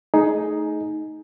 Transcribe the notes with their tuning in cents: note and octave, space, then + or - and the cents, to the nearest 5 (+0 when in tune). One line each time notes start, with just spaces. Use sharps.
A3 +0 D#4 +5 G#4 +15